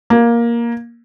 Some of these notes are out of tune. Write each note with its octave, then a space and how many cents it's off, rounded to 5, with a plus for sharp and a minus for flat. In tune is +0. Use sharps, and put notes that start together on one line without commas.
A#3 +10